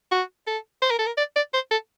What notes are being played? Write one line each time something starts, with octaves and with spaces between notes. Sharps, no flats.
F#4
A4
C5
A#4
A4
A#4
D5
D5
C5
A4